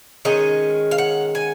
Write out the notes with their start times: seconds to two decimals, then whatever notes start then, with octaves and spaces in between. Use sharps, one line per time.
0.25 D#3 G#3 C#4 D#5
0.91 F5
0.98 F#5
1.35 G#5